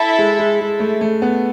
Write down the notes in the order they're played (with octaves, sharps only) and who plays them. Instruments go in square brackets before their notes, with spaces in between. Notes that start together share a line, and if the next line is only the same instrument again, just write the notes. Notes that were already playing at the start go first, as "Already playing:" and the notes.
Already playing: [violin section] E4 A4 E5
[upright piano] G#3
G#3
G#3
A3
A3
B3